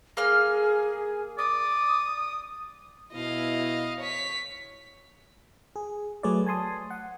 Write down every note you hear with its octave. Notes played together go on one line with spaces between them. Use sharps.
A#3 G#4 F5 F6
D5 D#6
B2 E4 D#5 F5
C#5 B6
G#4
F#3 A3 G#4 B4 C#5 D5
G#5 A5 C6 D#6
F#5